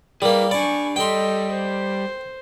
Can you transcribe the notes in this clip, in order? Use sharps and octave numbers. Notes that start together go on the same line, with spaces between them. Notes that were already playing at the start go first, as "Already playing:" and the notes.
G3 A#3 G#4 A#4 B4
D4 D5 G#5 B5 C#6
G3 A4 D#5 G5 C6
C5